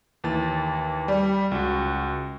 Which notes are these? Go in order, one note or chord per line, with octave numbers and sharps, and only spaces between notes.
D#2 E3 A6
G3
C#2 F#4